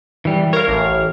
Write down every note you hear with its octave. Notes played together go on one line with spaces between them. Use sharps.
E3 G3
A#4 C#5 F5
A1